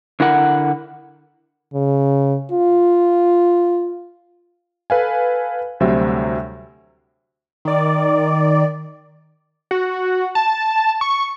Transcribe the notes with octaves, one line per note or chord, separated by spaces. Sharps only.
D3 E4 A#4 F#5
C#3
F4
A4 B4 F5 G#5
D2 C3 F#3 G3 C5 E5
D#3 D5
F#4
A5
C#6